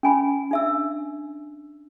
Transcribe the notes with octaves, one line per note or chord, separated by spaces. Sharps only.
C#4 G#5 B5
D4 E5 E6